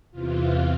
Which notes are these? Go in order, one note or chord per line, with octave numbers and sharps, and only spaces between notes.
E2 C3 E3 F4